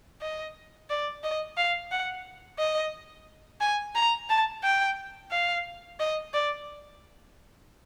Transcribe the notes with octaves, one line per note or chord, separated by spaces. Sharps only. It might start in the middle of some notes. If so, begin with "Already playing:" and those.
D#5
D5
D#5
F5
F#5
D#5
G#5
A#5
A5
G5
F5
D#5
D5